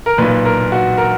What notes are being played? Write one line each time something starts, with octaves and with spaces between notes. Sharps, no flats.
A#4
B1 A#2 B4
A#4
F#4
A#4